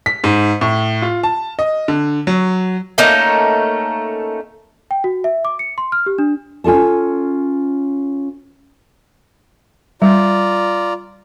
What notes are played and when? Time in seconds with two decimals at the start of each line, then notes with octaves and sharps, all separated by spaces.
0.06 B6
0.24 G#2
0.61 A2
1.02 F4
1.23 A5
1.59 D#5
1.88 D3
2.27 F#3
2.98 A3 A#3 C#4 D#4
4.91 G5
5.04 F#4
5.24 E5
5.45 D6
5.59 C#7
5.78 C6
5.92 F6
6.06 G4
6.18 D4
6.64 C#4 F4 A4 A5
10.02 G3 F4 D5 A#5